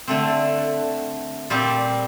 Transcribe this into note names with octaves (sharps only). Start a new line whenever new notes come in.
D3 A3 C4
A#2 G3 C4 G4